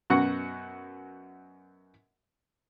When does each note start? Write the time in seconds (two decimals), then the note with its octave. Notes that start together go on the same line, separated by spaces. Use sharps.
0.10 F#2 B2 F#4 F#5 C#6